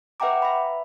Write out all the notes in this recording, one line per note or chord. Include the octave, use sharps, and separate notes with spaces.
B4 E5 F#5 G5 A#5 D6
E5 B5